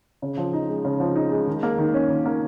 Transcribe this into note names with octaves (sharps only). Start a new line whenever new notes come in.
C#3
F3
D#4
G#3
C#3
F3
D#4
G#3
D#3
A#3
D#3
C#4
D#3
A#3